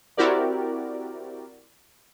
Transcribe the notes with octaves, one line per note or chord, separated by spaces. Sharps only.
C4 E4 F#4 G4 A#4 D5